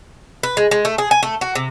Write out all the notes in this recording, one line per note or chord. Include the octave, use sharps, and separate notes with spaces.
B4
G#3
G#3
A3
G#4
G#5
A3
F#4
C3